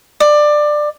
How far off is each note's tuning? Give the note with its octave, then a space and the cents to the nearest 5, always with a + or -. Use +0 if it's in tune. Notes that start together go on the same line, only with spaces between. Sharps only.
D5 +20